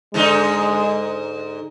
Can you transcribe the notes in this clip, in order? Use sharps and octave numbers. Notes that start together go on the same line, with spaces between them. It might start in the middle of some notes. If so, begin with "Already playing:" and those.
G#2 D3 G#3 D#4